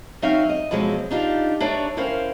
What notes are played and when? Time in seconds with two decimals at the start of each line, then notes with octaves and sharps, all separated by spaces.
0.22 F#3 C4 C#4 D#4 E5 F5
0.49 D#5
0.71 B2 F3 F#3 G#3 C4 C#4
1.11 D4 D#4 F4 G4
1.60 D4 B4 C#5 D5 E5 A#5
1.97 C#4 E4 A#4 C5 F5 G5